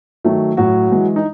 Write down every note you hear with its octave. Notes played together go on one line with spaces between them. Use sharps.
D#3 F#3 A3
A2 F#3 F#4
E3 G#3
D#4